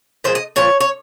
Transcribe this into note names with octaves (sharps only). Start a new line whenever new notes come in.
A#2 F3 G#3 C5
D#5
A#2 F3 C#5
C#5